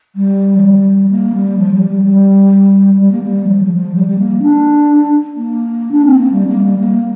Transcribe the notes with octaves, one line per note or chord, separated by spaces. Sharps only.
G3
F3
G3
A#3
G3
F3
G3
G3
G3
G3
A#3
G3
F3
G3
F3
G3
G3
A#3
D4
A#3
D4
C4
A#3
G3
A#3
G3
A#3